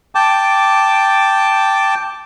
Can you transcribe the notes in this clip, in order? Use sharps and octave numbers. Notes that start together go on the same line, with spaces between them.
G5 A5 D6